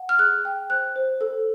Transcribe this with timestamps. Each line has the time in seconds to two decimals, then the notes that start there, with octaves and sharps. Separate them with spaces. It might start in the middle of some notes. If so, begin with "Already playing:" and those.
Already playing: F#5
0.09 F6
0.19 G#4 F#6
0.45 G5
0.70 C5 F#6
0.96 C5
1.21 A4